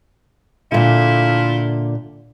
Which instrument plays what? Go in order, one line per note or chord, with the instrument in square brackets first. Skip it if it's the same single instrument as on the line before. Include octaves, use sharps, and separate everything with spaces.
[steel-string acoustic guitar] A#2 D3 [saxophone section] A3 E4 F4